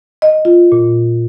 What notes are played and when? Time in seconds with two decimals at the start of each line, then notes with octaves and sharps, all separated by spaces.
0.22 D#5
0.45 F4
0.72 A#2